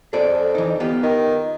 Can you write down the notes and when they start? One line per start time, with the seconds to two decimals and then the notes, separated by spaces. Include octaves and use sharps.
0.13 F2 G#4 A4 D5
0.55 E3 D#4
0.80 B3 F4 G4
1.03 D#3